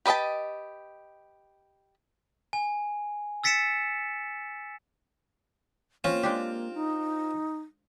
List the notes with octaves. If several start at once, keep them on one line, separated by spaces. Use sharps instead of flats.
G4 B4 D#5 G5 A5
G#5
E6 A6 B6 C#7 D7 E7
A#3 C4 C#4 F4
G#3 D4 G4
D#4